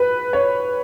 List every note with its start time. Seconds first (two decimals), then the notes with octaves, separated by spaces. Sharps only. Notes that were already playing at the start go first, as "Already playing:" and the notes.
Already playing: B4
0.33 C#5